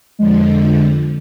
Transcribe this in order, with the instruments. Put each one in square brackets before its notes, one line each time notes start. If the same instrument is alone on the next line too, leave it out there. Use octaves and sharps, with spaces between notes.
[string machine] F2 D3 F3 [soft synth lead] G#3